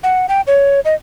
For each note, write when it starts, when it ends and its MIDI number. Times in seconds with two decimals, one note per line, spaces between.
0.03 0.26 78
0.29 0.41 79
0.47 0.80 73
0.85 0.95 75